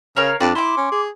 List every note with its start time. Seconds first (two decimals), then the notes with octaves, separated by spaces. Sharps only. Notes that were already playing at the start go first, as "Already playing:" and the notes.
0.16 C#3 A#4 C#5 F5
0.40 F2 D4
0.55 E4 C6 D6
0.77 C#4
0.92 G#4